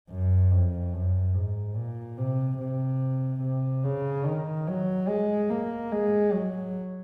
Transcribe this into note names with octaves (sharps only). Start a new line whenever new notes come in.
F#2
F2
F#2
G#2
A#2
C3
C3
C3
C#3
D#3
F#3
G#3
A#3
G#3
F#3